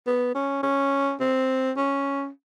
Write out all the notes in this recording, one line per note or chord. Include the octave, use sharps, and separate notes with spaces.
B3
C#4
C#4
C4
C#4